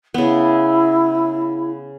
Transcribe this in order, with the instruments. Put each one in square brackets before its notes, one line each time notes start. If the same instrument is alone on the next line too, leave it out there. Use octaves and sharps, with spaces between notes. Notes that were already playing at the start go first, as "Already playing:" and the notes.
[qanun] C#3 B3 [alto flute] E4